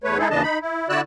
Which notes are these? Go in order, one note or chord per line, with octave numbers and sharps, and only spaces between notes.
E2 A3 B4 C#5
G#3 D#4 E4 G#4 A4
D#2 C#3 E3 D4 D#5 A5
D#4 B5
E4
D3 E4 F#4 D5 E6 F#6